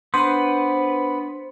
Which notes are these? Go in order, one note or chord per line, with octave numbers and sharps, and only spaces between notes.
B3 D4 B4 C5 C6